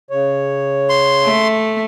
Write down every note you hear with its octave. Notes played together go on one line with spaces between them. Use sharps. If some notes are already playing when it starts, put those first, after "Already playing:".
C#3 C#5
C6
A3